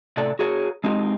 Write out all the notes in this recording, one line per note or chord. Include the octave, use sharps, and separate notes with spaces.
A2 C3 A4 D5
F#4 G#4 A#4 C#5
G#3 C4 D#4 G4